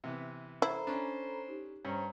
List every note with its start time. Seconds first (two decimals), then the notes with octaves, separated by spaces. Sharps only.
0.04 C3 E3 B3
0.62 E4 A4 C5 A#5 B5
0.87 C#4 D4
1.48 D#4 G4
1.85 G2 C#4 C5 A#5